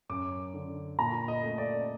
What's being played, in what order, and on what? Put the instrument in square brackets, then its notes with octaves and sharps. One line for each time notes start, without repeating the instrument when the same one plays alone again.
[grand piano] F#2 D6
D3
A#2 A#5
D#5
A3
D5